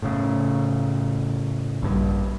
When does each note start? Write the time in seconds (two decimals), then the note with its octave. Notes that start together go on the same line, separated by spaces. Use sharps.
0.02 A2 C#3
1.82 A#1 G2